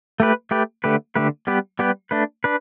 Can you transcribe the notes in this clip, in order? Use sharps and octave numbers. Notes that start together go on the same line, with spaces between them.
A3 G4 B4
A3 G4 B4
D3 A3 G4 B4
D3 A3 G4 B4
G3 B3 G4 B4
G3 B3 G4 B4
A3 D4 B4
D4 B4